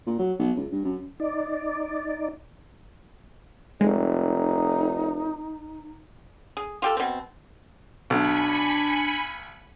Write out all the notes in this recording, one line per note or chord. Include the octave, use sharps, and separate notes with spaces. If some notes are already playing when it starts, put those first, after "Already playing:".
A#2
F#3
B1
C#2
G2
F#2
D#4 D5
F1 G#3 D#4
G#4
F4 G4 A4
B2 C4
B1 D4 G#5 B5 C#7